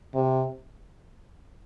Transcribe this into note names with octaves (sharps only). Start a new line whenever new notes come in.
C3